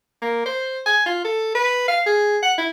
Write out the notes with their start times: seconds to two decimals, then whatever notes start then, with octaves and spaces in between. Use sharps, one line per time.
0.22 A#3
0.46 C5
0.86 G#5
1.06 F4
1.25 A4
1.55 B4
1.88 F5
2.07 G#4
2.42 F#5
2.58 E4